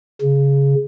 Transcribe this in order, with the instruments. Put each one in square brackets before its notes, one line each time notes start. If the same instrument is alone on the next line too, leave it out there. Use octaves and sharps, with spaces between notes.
[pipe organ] C#3